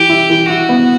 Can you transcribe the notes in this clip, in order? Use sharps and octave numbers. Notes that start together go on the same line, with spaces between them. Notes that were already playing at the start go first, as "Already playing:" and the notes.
Already playing: E3 G4
E4
E3
E4 F#4
B3